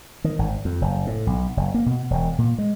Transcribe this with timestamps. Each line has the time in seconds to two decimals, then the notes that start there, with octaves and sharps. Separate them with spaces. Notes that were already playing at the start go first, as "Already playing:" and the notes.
0.24 D#3
0.39 G#1
0.65 F2
0.81 F#1
1.07 A2
1.27 B1
1.57 F#1
1.74 A#3
1.86 B2
2.10 E1
2.38 A#2
2.58 G#3